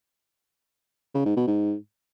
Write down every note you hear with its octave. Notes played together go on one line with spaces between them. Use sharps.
C#3
G#2
B2
G#2